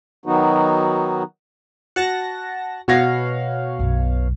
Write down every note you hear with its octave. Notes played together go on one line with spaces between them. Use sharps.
D#3 F#3 B3 D#4 F#4
F#4 F#5 A5 A#6
B2 F#4 C#5 F5 A#6
B1 F#2